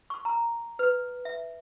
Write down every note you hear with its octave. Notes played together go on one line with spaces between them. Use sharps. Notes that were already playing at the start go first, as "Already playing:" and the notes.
C#6
A#5
B4
E5